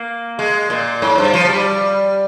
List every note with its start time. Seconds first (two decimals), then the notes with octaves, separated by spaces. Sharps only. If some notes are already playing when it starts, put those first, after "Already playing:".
Already playing: A#3
0.39 G#3
0.70 A#2
1.02 G#2
1.18 G2
1.34 F3
1.50 G3